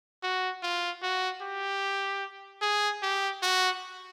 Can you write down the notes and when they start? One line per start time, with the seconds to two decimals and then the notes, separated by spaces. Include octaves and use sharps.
0.23 F#4
0.63 F4
1.02 F#4
1.42 G4
2.62 G#4
3.03 G4
3.43 F#4